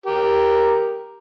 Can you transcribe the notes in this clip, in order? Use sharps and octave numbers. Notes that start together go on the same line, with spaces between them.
G4 A#4